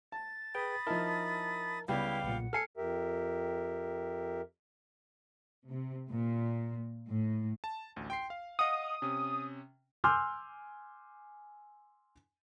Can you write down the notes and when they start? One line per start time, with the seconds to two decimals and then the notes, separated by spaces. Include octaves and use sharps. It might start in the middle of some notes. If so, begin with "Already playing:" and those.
0.12 A5 A6
0.55 G#4 B4 G5 B5 D#6
0.87 F3 D#4 E4 A#4 A5 A#5
1.88 C#2 G3 B3 E4 F5 G5 D6
2.24 B1 A#2 F#5
2.53 A4 G#5 F6 C7 C#7
2.77 F2 G4 A#4 E5
5.69 C3
6.09 A#2
7.08 A2
7.64 A5
7.96 A1 D2
8.10 G5 C6 C7
8.30 F5
8.59 D#5 F5 F#5 D#6
9.02 C3 C#4
10.04 G#5 C6 D6 E6 F6 G6